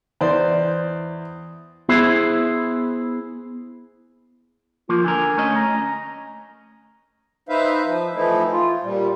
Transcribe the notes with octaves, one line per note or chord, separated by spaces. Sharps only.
E2 C5 D5
B3 E4 G#4 C5 E5
F3 A#3 F4
D3 A#4 G#5
A3 C#4 D#5
A#5
D#4 B4 C5 E5 F5
F3
E3 F3 A3 D#4 E4
F4
A#2 G3